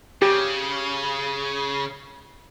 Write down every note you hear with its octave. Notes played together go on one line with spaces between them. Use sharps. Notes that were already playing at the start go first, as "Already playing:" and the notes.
C#3 G4